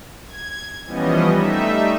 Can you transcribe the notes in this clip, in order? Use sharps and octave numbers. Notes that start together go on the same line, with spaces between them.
G#6
E3 F3 G3 B3 C#4 D#5
G3 A3 D#4 E5